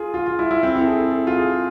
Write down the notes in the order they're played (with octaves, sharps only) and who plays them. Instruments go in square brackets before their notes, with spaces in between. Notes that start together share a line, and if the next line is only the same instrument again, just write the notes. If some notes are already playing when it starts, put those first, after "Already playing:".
Already playing: [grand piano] F4 G#4
F4
F4
E4
E4
C4
E4
A4
G#4
A4
A4
F4
G#4